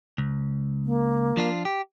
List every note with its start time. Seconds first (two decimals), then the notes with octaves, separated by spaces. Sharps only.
0.18 C#2
0.85 A#3
1.37 F3 D4 F4
1.65 G4